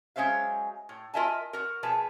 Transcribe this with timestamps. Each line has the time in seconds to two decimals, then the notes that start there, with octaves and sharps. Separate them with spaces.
0.16 F#3 G#3 C#4 C5 E5 F5
0.89 A2
1.14 F4 A#4 D#5 E5 G#5 A5
1.53 F#4 A#4
1.83 B2 F3 G#4 B4 A5